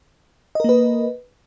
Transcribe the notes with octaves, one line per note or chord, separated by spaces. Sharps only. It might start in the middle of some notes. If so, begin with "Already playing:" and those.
A#3 A#4 B4 D#5